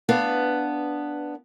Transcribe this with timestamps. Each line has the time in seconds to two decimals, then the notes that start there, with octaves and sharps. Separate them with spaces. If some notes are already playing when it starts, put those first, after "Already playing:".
0.09 B3 D4 B4 F5